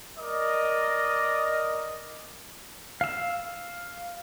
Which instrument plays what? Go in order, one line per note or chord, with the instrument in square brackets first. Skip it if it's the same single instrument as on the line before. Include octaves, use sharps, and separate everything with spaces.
[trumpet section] A#4 D5 D#5
[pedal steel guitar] F5 E6